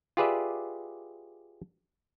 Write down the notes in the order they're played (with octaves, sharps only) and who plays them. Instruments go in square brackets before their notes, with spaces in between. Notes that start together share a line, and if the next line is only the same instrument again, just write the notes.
[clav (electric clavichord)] F4 G4 G#4 B4 D5 E5